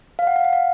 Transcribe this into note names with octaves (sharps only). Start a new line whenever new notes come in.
F5
F#5
F5
F#5
F5